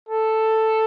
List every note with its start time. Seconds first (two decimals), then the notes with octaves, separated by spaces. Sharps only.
0.09 A4